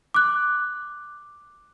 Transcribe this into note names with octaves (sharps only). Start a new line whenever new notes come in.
D6 F#6